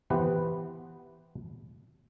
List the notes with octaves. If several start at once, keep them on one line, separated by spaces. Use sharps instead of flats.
E3 B3 G4 B4 C5